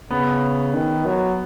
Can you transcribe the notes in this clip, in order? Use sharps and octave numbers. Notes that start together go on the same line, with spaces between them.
C#3 B3
D#3
F#3